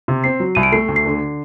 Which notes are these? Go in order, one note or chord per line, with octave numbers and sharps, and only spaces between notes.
C3
C4 C7
F#3
C2 D#7
D7
A3 C7
D2
C7
D3